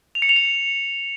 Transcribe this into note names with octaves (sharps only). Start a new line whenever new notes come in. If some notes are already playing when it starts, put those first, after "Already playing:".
F7
C#7
F7
C#7